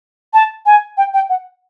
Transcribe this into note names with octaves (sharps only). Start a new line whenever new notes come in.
A5
G#5
G5
G5
F#5